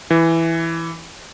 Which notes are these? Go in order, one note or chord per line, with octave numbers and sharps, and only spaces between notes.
E3